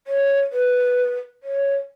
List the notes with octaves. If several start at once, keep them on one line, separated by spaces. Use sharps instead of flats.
C#5
B4
C#5